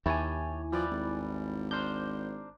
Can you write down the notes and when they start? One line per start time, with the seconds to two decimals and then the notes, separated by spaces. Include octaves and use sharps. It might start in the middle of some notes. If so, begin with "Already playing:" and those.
0.06 D#2 E4 G4 C#5 G#5 A5
0.73 F3 G3 B4 D5
0.91 G#1
1.71 D4 A#4 C5 G6